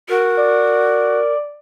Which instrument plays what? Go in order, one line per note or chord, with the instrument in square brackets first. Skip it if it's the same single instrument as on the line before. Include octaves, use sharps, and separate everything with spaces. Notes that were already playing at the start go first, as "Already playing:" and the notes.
[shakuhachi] F#4 [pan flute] A#4
[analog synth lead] D5